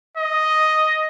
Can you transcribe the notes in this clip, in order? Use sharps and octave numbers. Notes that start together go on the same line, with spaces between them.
D#5